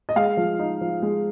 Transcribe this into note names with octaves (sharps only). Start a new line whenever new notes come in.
D#5
G#3 F5
F3
D#4
F3
G#3